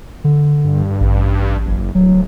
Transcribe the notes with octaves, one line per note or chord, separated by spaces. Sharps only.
D3
G2
A1
F#1
D1 F#3